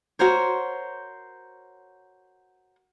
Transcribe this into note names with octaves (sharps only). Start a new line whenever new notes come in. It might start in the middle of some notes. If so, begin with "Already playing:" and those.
F#4 A#4 C5 C#5